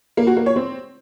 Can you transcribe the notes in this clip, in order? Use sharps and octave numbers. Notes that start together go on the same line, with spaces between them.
A#3
F#4
A#3
C#5
C4